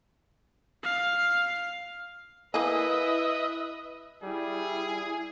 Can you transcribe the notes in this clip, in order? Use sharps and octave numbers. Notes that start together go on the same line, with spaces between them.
F5
A#3 E4 G#4 B4 D#5 E5
G3 E4 G#4